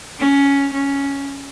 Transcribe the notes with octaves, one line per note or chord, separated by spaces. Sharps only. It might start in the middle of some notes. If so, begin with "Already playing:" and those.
C#4
C#4